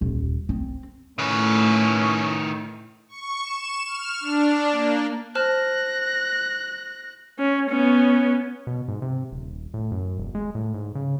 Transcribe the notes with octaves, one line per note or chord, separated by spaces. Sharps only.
D#1
C4
A2 D#3 C#4 B4
C#6
E7
F6
D4
A#3
C5 A5 F6 F#6 A#6
C#4
B3 C#4
B2
G#2
C3
D#1
A2
F#2
E1
G#3
A2
G#2
C#3